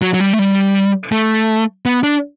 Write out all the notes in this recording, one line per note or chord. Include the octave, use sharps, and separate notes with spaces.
F#3
F#3
G3
A3
G3
A3
B3
D4